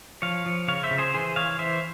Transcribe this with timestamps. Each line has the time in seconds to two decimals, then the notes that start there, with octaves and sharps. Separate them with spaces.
0.22 F3 C#5 F5
0.46 F3
0.68 C#3 C#5 F5
0.83 C5 E5
0.91 C#3
0.98 G#4 C5
1.14 E3 G#4 C5
1.36 E3 C#5 F5
1.59 E3 C5 E5